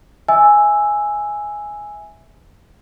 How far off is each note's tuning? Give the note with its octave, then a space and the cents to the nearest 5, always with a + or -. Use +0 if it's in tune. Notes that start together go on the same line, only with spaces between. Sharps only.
E5 -10 G#5 +0 E6 +0